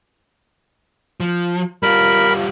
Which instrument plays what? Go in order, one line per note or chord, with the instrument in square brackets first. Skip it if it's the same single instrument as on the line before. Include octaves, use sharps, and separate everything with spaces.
[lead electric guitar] F3
[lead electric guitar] G3 F4 [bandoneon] A#4 B5